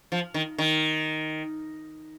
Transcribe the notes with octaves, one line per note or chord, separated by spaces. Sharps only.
F3
D#3
D#3